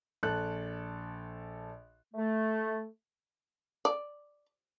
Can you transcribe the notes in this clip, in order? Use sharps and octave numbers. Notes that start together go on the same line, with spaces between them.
A#1 A4 F#6
A3
D5